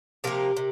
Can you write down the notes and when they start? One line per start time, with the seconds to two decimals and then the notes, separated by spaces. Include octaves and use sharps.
0.24 C3 F3 A#3 G4 A#4
0.57 C3